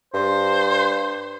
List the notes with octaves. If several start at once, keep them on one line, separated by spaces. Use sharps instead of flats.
G2 C5